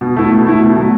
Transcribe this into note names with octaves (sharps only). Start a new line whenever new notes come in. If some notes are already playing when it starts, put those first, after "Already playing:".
B2
A3 E4
B2
A3 E4
B2
F#3 A3